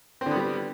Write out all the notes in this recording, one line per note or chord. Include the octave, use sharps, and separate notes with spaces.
D3 G3 B3 C4